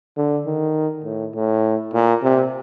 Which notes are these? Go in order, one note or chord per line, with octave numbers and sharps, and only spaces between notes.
D3
D#3
A2
A2
A#2
C3